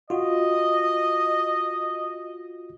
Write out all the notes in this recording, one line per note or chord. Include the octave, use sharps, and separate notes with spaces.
F4 F#4 D#5